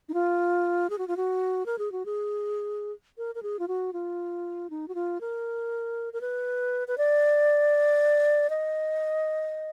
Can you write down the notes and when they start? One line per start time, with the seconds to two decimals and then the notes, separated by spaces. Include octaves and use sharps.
0.09 D#4
0.14 F4
0.90 G#4
0.98 F#4
1.08 F4
1.17 F#4
1.66 A#4
1.79 G#4
1.92 F#4
2.06 G#4
3.18 A#4
3.35 A#4
3.43 G#4
3.59 F4
3.68 F#4
3.93 F4
4.70 D#4
4.88 F#4
4.95 F4
5.21 A#4
6.13 A#4
6.21 B4
6.88 B4
6.98 D5
8.50 D#5